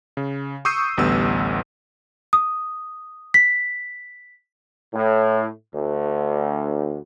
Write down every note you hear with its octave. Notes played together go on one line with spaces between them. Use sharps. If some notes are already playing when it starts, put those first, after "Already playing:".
C#3
C#6 D#6 E6 G6 C7 D#7
A1 D2 G3 B3 E6
D#6
B6
A2
D2